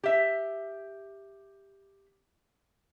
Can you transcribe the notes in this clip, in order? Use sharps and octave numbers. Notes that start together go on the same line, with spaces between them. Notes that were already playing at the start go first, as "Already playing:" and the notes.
G4 E5